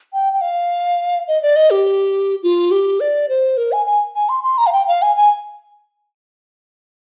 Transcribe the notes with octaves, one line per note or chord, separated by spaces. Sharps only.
G5
G5
F5
D#5
D5
D#5
G4
F4
G4
D5
C5
A#4
G#5
G#5
G#5
C6
C6
A#5
F5
G5
F5
G#5
G#5